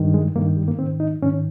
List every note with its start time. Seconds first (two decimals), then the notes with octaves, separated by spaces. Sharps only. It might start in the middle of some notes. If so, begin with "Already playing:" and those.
Already playing: G2 D#3
0.14 G#3
0.36 G2 D#3 A#3
0.57 G3
0.68 A#3
0.79 G#2 D#3 C4
1.00 D#4
1.22 G#2 D#3 C#4